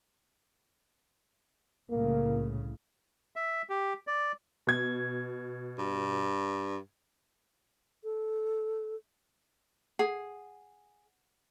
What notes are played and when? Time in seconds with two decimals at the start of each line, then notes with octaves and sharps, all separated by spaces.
1.90 C2 A2 C#3 A#3
3.36 E5
3.69 G4
4.07 D5
4.67 B2 G#6
5.78 G2
8.04 A4
9.99 G#4 F#5